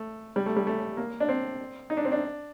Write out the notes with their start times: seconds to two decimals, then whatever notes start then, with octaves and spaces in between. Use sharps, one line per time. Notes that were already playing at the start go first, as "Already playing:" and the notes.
Already playing: A3
0.36 G3
0.46 A3
0.56 G3
0.67 A3
0.97 A#3
1.20 D4
1.29 C4
1.90 D#4
1.97 D4
2.05 C4
2.12 D4